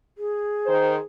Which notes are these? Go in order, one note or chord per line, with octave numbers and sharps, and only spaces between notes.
G#4
D#3 A#4 C5